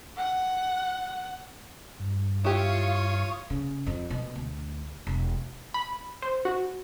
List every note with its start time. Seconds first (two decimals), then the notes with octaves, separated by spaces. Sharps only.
0.17 F#5
2.00 G2
2.44 E4 F4 G4 C#5 F5 C#6 D#6
3.50 C#3
3.87 F2
4.10 B2
4.35 D2
5.07 E1
5.74 B5
6.22 C5
6.45 F#4